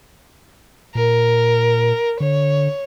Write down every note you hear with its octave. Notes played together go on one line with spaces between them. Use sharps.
A#2 A#4
D3 C#5